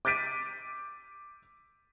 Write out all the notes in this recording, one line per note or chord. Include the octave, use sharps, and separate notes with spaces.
D6 G6 A6 B6 D7 D#7